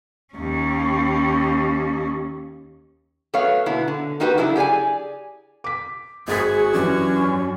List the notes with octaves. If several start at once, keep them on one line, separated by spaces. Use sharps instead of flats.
D#2 C#4
F#3 A3 B3 C#5 F5
B2 D3 A#3 B3 E4
D3
A#3 D#4 F#4 G4 A#4 B4
C#3 F#3 A3 D4 E4
G4 G#4 C#5 D5 G#5
D6 B6
G#1 F#4 G#4 C#6 G#6 A6 B6
F#2 E3 C#4 D4 G4